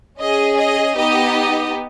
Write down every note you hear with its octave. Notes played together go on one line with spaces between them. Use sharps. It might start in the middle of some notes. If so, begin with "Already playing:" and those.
C#4 G#4 D#5
D#5
B3 D#4 G4 D#5